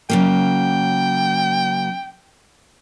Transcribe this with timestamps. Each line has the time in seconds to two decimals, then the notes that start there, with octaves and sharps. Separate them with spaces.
0.10 C#3 F#3 A#3 G5